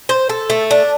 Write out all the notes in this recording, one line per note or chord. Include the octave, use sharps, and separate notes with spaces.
C5
A4
A3
D4